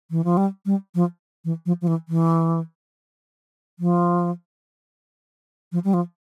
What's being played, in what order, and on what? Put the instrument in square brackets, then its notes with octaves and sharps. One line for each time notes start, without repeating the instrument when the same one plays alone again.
[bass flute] E3
F3
G3
G3
F3
E3
F3
F3
E3
E3
F3
F3
G3
F3